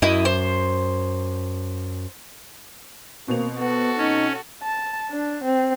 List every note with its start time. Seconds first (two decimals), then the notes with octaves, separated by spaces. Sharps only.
0.02 F#2 E4 D#5
0.25 C5
3.28 B2 A#3 C4 F7
3.59 B3 F#4 A4
3.97 C#4 D#4
4.62 A5
5.10 D4
5.44 C4